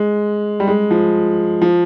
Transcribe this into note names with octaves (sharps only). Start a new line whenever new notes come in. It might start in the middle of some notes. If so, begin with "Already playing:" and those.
Already playing: G#3
G3
G#3
F3
F3